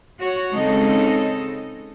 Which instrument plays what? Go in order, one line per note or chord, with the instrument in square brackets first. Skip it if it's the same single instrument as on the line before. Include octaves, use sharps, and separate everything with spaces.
[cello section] F#4 C#5
C#3 G#3 C4 D#4 A4 D#5